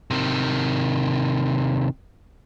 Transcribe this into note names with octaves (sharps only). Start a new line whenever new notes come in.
C3 D#3